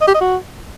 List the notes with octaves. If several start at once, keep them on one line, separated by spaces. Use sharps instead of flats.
D#5
G4
D#5
F#4